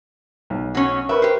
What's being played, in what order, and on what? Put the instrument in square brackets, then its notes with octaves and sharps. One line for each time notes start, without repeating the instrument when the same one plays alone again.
[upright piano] B1
[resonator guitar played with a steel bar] F#3 C#4
[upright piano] A#4 B4 C#6 [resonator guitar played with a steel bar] E5
[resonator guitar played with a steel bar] G4 C5